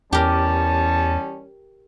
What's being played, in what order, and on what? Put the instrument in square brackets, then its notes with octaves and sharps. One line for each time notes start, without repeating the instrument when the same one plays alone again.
[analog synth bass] E2 [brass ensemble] E3 G3 C#4 [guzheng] G4 A#4 [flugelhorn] A5